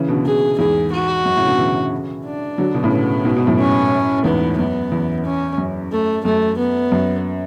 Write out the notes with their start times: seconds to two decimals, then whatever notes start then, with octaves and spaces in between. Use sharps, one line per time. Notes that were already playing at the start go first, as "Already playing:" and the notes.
Already playing: C#3 E3
0.08 B2 D3
0.25 B2 D3 G#4
0.58 E2 G#2 G#4
0.92 F#4
1.25 F#2
1.36 A2 C#3
1.47 B2 D3
1.58 C#3 E3
2.25 D4
2.58 D3 F#3
2.74 B2 D3
2.83 A2 C#3
2.91 B3
3.25 G#2 B2
3.36 G#2 B2
3.47 F#2 A2
3.59 C#4
4.24 E2 G#2 B3
4.58 F#2 B3
4.92 E2
5.25 C#4
5.58 F#2
5.92 A3
6.24 F#2 A3
6.58 B3
6.92 F#2